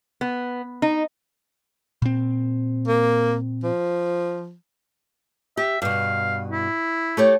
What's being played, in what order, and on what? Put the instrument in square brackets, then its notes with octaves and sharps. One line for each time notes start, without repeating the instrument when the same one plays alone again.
[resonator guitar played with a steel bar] B3
D#4
[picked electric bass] A#2 C4
[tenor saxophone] A#3
F3
[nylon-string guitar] G4 [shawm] E5
[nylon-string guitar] G2 B2 [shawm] F5
[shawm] E4
[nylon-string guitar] A3 G4 C#5